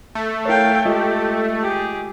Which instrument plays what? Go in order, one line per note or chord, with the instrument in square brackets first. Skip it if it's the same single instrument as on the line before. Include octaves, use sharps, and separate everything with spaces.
[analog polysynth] A3
[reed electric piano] E4 A#4 C#5 [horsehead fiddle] F5 G5
[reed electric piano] G#3 F4 D#5 [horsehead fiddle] G4
[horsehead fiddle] G4 G#4